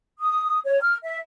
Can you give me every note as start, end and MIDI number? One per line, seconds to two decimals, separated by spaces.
0.19 0.58 87
0.64 0.78 73
0.81 0.97 89
1.03 1.18 76